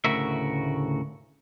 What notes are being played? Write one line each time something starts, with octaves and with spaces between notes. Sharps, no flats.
D2 A2 C#3 F#4 A#4 E5